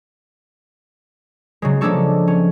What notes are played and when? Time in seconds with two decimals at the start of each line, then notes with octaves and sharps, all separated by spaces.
1.62 C#3 F#3 G#3
1.81 F3 G#3 A#3 D4 A4 C#5
2.28 C#4